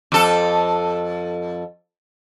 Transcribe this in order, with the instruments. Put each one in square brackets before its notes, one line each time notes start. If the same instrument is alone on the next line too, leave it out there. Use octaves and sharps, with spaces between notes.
[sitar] F2 A4